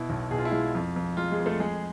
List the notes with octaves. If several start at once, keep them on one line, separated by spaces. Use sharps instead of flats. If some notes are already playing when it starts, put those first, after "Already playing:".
Already playing: B2 E4
B1
B2 G#4
F4
E4
G#3 F4
F2
F2
G#3 F4
G#3 G#4
F2
A3 A4
G#3 G#4